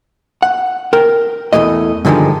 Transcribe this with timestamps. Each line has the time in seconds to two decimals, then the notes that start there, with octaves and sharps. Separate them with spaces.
0.42 F#5
0.93 A#4 G5
1.53 E2 C3 E3 A3 D#5
2.05 G2 D3 D#3 F3 G#3